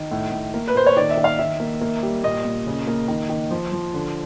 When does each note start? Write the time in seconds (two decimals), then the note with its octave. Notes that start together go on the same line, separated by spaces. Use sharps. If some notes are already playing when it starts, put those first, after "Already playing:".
Already playing: D#3
0.11 A2
0.32 A2
0.54 A#3
0.68 B4
0.75 A#2 C5
0.86 C#5
0.97 D#3 D5
1.10 E5
1.17 D#3
1.24 F5
1.38 D#3 E5
1.60 A#3
1.81 A#3
2.03 G3
2.23 A#2 D#5
2.44 A#2
2.67 C#3
2.87 A#3
3.08 D#3
3.29 D#3
3.51 F3
3.72 F3
3.94 D3